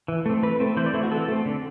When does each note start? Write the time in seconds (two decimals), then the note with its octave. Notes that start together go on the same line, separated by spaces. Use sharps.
0.08 E3
0.26 A3 C4
0.42 E3 B4
0.60 A3 C4
0.77 E3 C5
0.86 D5
0.94 A3 C4 E4
1.03 F#4
1.11 E3 A4
1.28 A3 C4
1.45 D3